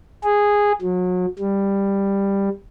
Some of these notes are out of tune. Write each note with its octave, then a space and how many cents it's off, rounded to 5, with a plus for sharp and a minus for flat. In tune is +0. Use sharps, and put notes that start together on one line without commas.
G#4 -10
F#3 -35
G3 +10